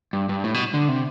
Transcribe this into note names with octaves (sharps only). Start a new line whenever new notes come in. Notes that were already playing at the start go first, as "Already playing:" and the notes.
G2
G2
A2
B2
D3
C3